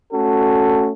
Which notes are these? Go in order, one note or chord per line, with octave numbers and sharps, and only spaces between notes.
A3 C#4 F#4 A4